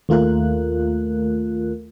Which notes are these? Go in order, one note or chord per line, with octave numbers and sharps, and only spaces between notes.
D#2 A3 F4 A#4 F#6